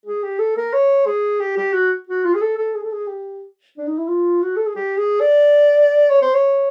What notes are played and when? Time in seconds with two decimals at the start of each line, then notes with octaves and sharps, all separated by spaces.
0.06 G#4
0.23 G4
0.39 A4
0.57 A#4
0.73 C#5
1.06 G#4
1.40 G4
1.57 G4
1.73 F#4
2.07 F#4
2.24 F4
2.34 G#4
2.41 A4
2.58 A4
2.74 G#4
2.83 A4
2.92 G#4
3.07 G4
3.77 D4
3.87 D#4
3.98 E4
4.08 F4
4.42 F#4
4.57 A4
4.66 G#4
4.75 G4
4.98 G#4
5.20 D5
6.10 C#5
6.22 C5
6.34 C#5